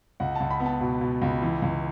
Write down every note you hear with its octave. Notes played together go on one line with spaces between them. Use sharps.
C#2 F#5
A5
C#2
B5
B3
A5
B2
B2
C#2
E3
C#2